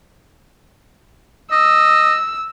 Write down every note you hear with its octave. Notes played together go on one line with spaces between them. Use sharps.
D#5 E6